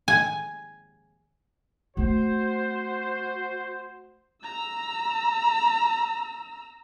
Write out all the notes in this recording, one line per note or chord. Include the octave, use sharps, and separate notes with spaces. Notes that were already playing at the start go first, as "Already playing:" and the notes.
G#5
A3 C4 F#4 C5
A#5 E6